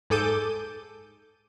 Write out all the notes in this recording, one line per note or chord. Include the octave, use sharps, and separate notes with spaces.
G#2 G#4 A4 D6 G6 D#7